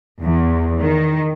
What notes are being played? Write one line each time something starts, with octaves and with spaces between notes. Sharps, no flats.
E2
D#3